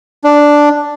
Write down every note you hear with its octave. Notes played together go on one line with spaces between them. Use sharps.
D4